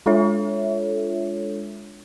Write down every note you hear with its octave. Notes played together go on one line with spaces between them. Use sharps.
G#3 D4 F4 A4 C#5 E5